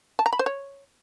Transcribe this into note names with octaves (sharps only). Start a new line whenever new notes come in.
A5
A#5
B5
C5
C#5